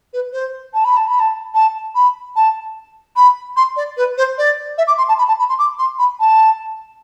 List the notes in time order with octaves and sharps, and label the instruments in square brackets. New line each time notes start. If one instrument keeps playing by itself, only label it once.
[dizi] B4
C5
A5
B5
A5
B5
A5
A5
B5
A5
B5
C6
D5
B4
C5
D5
E5
D6
C6
A5
B5
A5
B5
C6
D6
C6
B5
A5